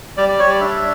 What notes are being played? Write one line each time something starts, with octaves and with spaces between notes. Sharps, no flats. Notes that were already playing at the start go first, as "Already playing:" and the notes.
G3 D5
D5
G3 C#5
D5
D4 E5